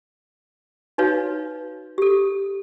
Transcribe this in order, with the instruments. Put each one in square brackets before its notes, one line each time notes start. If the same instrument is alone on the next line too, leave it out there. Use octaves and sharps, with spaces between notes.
[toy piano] D#4 F#4 B4 C#5 F5
G4 A4